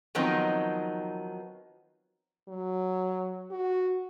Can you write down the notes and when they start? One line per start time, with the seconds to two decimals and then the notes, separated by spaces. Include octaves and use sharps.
0.15 D#3 F3 F#3 B3 C4 D#4
2.48 F#3
3.51 F#4